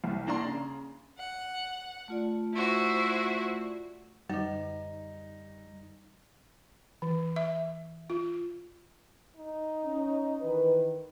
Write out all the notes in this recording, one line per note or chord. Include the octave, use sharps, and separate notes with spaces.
C2
A#3 D4 A#5 C6
C#3
F#5
A3 F4 D5
E4 F#4 C5
F#2 D3 G3 D#4
E3
E5
F4
D#4
C#4
D#3 E3 B4